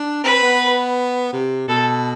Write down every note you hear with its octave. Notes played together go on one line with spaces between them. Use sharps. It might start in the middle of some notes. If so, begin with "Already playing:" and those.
Already playing: D4
C4 B4
B3
C3
B2 A4